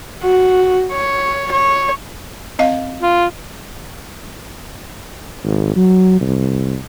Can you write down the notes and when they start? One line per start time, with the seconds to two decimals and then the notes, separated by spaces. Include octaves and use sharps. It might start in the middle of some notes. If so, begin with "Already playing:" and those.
0.23 F#4
0.92 C#5
1.51 C#5
2.59 C4 D#5 F5
3.01 F4
5.45 G#1
5.76 F#3
6.21 C2